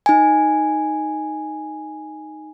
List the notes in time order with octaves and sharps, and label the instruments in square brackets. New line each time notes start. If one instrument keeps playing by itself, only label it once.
[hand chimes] D#4 G#5